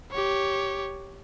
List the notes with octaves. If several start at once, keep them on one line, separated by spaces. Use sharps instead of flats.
G4 C#5